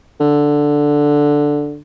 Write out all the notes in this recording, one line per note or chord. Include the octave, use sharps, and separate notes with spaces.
D3